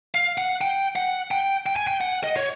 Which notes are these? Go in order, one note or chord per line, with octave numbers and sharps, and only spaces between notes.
F5
F#5
G5
F#5
G5
G5
G#5
G5
F#5
D#5
C#5